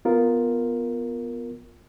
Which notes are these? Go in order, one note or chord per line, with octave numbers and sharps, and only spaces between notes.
B3 F4 A#4